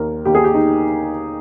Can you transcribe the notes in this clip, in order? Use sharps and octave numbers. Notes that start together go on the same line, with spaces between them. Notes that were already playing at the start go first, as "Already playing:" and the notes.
Already playing: D#2 A#4
D#2 G4
G#4
G4
D#4